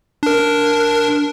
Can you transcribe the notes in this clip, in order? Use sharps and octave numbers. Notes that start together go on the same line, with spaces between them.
D4 A#4